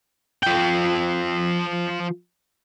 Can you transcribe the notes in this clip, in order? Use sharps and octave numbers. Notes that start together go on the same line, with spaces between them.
F3 G5